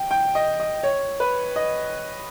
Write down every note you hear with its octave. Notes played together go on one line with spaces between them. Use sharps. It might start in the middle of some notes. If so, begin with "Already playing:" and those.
Already playing: G5
G5
D#5
D#5
C#5
B4
D#5